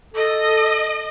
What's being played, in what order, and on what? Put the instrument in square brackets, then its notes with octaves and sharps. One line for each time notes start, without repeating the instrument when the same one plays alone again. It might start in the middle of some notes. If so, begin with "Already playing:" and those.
[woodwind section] A4 [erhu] D#5